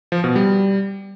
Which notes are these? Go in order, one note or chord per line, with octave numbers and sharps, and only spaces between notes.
F3
B2
G3